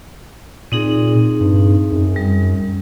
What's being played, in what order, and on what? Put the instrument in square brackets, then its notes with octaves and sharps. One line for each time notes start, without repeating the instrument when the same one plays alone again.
[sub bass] A#2 [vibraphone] C4 D#4 G#4
[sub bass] G2
F#2
[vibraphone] G3